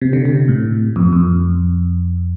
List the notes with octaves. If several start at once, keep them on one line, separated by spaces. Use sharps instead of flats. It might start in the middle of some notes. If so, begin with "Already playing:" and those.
C3
D3
C3
A2
F2
F2